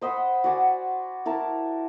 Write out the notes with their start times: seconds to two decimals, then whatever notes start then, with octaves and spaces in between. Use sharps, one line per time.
0.01 C5 D#5 F#5 B5
0.44 F#4 D5 G#5
1.26 E4 A#4 A5